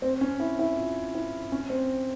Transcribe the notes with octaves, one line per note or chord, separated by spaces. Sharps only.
C4
C#4
E4
E4
F4
E4
C#4
C4